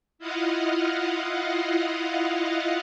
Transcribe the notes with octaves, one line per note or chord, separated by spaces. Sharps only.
E4 F4 D#5 F5 F#5